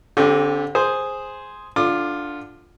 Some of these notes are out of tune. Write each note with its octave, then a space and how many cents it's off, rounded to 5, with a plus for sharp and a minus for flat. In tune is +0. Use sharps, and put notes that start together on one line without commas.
D3 -25 C4 +20 G4 +0
G#4 +0 C5 +0
D3 +0 F4 +0 D6 +30